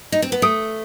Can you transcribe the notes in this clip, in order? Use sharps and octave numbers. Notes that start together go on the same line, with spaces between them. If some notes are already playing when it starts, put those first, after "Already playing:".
D#4
C4
B3
A3 D#6